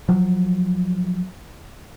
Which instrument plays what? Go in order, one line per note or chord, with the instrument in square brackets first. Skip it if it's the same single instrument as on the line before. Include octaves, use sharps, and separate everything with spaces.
[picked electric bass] F3 F#3